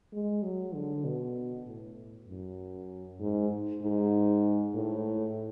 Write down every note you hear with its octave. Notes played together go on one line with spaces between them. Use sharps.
G#3
F#3
D3
B2
A2
F#2
G#2
G#2
A2